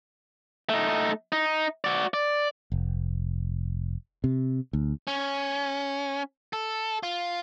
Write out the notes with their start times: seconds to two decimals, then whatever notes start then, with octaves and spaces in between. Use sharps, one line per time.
0.69 A3 D#4
1.32 D#4
1.84 F#4 D5
2.14 D5
2.72 F1
4.24 C3
4.73 D2
5.07 C#4
6.53 A4
7.03 F4